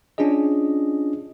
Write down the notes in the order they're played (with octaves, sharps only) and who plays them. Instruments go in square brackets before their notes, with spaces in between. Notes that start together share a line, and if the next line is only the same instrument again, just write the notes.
[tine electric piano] C#4 D4 F4 G#4 D#5